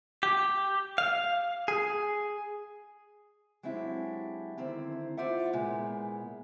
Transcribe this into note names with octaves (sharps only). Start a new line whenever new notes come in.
G4
F5
G#4
F#3 G#3 C4 D4 E4 G4
D3 D#3 C4 E4 C5
E4 F4 C5 D5 E5 F#5
A#2 G#3 B3 E4